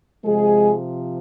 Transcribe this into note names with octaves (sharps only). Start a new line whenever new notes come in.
C3 F3 G#3 G#4